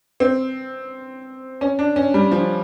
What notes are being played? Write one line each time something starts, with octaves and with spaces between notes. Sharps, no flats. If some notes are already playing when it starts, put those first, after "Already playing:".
C4
C#4
D4
C#4
G3
F3